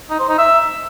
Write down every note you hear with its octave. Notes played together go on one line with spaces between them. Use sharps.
D#4
C5
D#4
E5